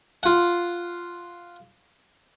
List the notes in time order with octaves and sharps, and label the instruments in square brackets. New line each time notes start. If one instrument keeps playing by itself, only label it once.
[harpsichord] F4 F#5